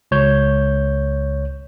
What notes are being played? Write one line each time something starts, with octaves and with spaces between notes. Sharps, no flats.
C#2 C#5 G6